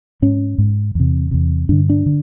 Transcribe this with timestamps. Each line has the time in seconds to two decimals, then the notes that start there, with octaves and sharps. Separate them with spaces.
0.22 G#2 C#4
0.58 G#2
0.95 E2 C3
1.31 E2 C3
1.69 G2 D3 D4
1.90 D4
2.06 D3